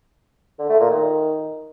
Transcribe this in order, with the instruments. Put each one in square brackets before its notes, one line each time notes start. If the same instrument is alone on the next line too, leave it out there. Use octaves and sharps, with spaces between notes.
[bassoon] D3
A3
A#2
D#3